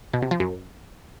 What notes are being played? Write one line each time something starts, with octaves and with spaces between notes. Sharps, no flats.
B2
C3
F3
F#2